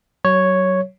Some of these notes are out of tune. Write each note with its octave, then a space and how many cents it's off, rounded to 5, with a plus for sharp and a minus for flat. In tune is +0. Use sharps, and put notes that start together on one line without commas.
F#3 +25 C#5 +0